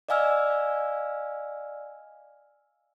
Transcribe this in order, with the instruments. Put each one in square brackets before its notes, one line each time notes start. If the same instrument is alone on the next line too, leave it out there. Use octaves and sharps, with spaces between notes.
[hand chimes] D5 D#5 F5 G#5 E6 F6